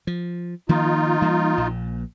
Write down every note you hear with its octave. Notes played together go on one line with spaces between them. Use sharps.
F3
D#3 F3 A#3 D#4 F4
E3 G3 A#3
A#1 A#2